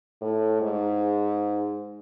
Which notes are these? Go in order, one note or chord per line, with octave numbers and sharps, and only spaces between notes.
A2
G#2